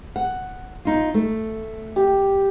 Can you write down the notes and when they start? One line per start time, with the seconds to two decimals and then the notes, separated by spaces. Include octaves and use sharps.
0.16 F#5
0.85 D#4 F4
1.14 A3
1.96 G4